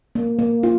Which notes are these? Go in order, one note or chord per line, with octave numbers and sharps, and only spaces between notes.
A#3
A#3
F4